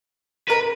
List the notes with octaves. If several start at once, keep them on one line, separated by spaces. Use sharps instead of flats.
A#4 B4